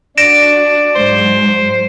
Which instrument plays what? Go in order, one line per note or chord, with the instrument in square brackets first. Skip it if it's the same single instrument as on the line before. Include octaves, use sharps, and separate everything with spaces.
[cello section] D4 F#4 [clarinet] D5 [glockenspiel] A#6 D7 E7
[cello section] G#2 F#3 [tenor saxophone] C5